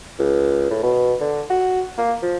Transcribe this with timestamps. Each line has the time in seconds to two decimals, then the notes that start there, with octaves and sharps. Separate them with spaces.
0.19 C#2
0.71 A2
0.83 B2
1.21 D3
1.50 F#4
1.98 A#3
2.22 F3